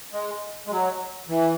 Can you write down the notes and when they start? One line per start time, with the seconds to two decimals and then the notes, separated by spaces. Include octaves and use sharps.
0.13 G#3
0.67 G#3
0.71 F#3
1.29 E3